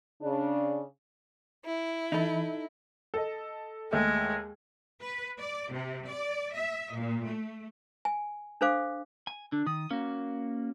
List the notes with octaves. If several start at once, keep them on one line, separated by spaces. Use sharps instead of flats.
C#3 D4
E4
E3 D#4 A4 B5
A4 D#5
D#2 G#3 A3
B4
D5
C3
D5
E5
A#2
A3
G#5
D4 A4 C5 F5 D6
G#5
D3 D4
D#3 D#6
A#3 C#4 F#4